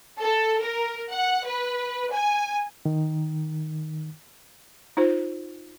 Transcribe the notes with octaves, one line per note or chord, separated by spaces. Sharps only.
A4
A#4
F#5
B4
G#5
D#3
D#4 F4 C5